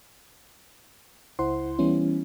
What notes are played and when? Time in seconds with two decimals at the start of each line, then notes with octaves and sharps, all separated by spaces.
1.39 C#2 E4 C5 F#5 C6
1.79 E3 G3 B3 C#4 E4